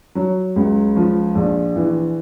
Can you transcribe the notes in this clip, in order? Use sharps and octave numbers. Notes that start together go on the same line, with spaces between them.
F#3
C#2
F3
A#1
E3